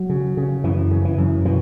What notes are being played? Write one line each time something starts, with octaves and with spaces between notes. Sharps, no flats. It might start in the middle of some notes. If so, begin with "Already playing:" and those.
Already playing: F#3
C#3
C#3
F#2 E3
C#3
E3
F#2
B2 E3